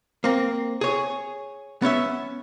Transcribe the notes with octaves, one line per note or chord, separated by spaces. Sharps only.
A#3 C4
G#4 C#5
B3 C#4 C#5 E5